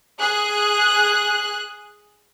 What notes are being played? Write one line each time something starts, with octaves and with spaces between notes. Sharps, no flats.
G#4 F#6